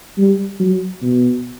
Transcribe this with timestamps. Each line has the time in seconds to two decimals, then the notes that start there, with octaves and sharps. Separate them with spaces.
0.18 G3
0.60 F#3
1.02 B2